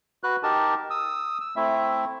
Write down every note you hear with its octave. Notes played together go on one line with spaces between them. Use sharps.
F#4 B4 F#6
D#4 G4 A#4 A5
D#6 E6
E6
A3 C4 E4 E5